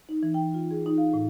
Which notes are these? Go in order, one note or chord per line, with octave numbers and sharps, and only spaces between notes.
D#4
E3
G5
F4
G#4
D#4
F5
A2